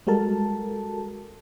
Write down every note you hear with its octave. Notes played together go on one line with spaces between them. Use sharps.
G3 G#3 F#4 A4 A#4 A5